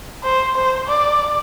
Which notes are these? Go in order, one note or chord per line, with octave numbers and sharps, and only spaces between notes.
C5
C5
D5